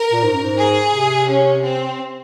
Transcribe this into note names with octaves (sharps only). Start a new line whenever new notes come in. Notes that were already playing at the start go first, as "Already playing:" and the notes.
Already playing: A#4
A#2
G#2
F#2
G#2
G#4
C3
C#4
C4